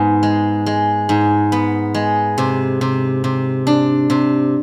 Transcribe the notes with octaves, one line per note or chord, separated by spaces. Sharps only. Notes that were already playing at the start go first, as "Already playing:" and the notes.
Already playing: G#2 B3
G#3
G#3
G#2
B3
G#3
C3
C3
C3
D4
C3